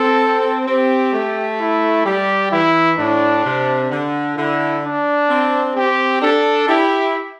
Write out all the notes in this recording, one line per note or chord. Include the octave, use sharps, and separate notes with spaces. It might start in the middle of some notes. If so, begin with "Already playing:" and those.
Already playing: C4 A4
C4 G4
A3
E4
G3 G4
E3 E4
A2 D4
C3
D3
D3 E4
D4
C4
C4 G4
D4 A4
E4 G4